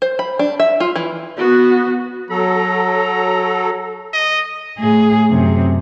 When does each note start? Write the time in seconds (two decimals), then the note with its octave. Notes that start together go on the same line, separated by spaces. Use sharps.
0.02 C5
0.19 B5
0.39 D4
0.60 E5
0.80 F4
0.96 E3
1.37 B3 F#4
2.30 F#3 A4 A#5
4.13 D#5
4.78 A2 G#4
5.31 F#2 C3